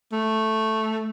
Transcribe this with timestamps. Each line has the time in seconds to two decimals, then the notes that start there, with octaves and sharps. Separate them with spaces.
0.12 A3